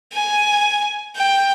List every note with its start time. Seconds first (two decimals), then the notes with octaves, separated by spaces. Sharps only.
0.13 G#5
1.16 G5